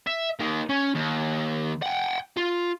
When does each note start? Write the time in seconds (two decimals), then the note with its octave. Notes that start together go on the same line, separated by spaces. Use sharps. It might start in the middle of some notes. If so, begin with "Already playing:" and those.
0.07 E5
0.39 A#3 D#4
0.69 C#4
0.94 D#2
1.82 F#5 G5
2.37 F4